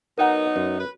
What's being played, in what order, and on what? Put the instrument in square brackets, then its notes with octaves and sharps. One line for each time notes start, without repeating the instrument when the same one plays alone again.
[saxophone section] F#3 B3 D#4 [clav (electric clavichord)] A#4 F#5
[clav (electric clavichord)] F#2
[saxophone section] B4